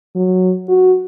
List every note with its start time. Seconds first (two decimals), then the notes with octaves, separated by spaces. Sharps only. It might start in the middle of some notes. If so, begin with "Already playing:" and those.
0.16 F#3
0.69 F#4